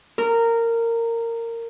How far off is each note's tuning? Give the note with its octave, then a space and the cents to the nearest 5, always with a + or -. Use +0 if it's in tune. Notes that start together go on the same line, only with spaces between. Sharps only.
A#4 -15